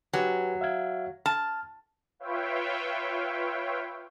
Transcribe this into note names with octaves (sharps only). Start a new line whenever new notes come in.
F#3 G4 B4 G#5
E5 F5 G#6
A5 F6
F4 B4 C#5 E5 F5 G5